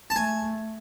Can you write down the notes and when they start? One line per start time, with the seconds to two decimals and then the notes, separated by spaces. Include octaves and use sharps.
0.10 A5
0.15 A3 G#5